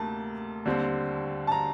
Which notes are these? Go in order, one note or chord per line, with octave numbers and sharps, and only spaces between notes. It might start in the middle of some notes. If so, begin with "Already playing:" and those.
Already playing: D2 C3 A#3 A5
D#2 D3 G3 C4
A5
A#5